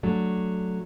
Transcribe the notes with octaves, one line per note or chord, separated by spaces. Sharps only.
F#3 A3 D4